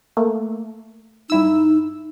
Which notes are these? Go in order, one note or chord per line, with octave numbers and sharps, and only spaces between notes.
A3 A#3
G2 D#4 E4 E6